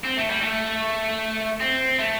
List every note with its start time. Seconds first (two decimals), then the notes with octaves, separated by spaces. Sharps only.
0.04 C4
0.17 A3
0.30 G3
0.42 A3
1.60 C4
1.99 A3